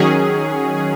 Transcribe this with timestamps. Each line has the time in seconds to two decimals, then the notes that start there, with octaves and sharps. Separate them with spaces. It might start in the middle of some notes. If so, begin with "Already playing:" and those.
Already playing: D#3 F#3 C#4 G#4